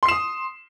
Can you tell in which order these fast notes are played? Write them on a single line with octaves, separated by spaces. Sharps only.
C6 C7 E7 D#6